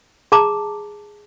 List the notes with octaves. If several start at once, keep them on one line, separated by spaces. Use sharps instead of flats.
G#4 A5 A#5 D6